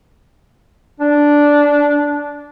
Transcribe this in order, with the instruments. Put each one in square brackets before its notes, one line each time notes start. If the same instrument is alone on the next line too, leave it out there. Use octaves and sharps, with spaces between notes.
[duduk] D4